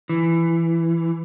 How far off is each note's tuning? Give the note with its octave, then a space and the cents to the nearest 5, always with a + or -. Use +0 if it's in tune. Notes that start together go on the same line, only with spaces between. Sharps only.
E3 +15